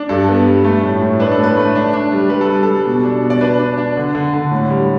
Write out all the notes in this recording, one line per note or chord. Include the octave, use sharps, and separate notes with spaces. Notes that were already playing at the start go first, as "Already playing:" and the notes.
Already playing: D4
G2 A4
B3
G3
A3
A2
A2
D4 B4
A4
A2
B4
A3
D4
D4
G3
G3 B4
A4
G3
A4
G3
B2
D4
B2
D5
D4 B4
D4
D4
D3
D3
D3
A2
G3